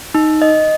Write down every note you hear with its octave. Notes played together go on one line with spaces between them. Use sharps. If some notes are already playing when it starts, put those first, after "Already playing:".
D#4
D#5